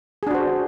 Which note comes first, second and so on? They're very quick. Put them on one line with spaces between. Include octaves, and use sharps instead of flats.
G#4 D4 F#4 C5